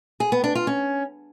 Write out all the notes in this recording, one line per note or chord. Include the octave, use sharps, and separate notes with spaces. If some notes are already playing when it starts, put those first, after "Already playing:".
G#4
B3
D4
F4
C#4